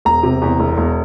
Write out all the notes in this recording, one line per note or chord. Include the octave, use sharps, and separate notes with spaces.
E1 A#5
C3
E2
E1
E1